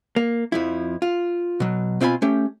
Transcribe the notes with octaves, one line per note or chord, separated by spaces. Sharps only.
A#3
F2 F3 E4
F4
B2 F#3
B2 C4 F4 G#4 G#5 B5
A3 C#4 G4